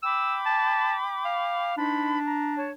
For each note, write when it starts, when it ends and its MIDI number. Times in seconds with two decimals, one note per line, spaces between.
0.03 1.74 79
0.03 1.74 83
0.03 1.74 86
0.03 0.36 88
0.46 0.94 81
1.25 1.73 77
1.77 2.75 62
1.77 2.18 63
1.77 2.18 72
1.77 2.18 83
2.26 2.54 82
2.57 2.71 73
2.57 2.71 81